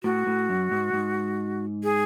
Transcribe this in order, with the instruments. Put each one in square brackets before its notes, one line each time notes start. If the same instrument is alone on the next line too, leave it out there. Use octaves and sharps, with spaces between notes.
[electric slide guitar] A2 [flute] F#4
[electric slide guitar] A2
F#2
G#2
G#2
[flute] G#4